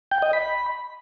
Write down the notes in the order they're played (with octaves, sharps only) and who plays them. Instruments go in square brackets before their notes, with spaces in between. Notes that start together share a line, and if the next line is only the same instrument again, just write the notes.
[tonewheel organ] G5
D#5
B5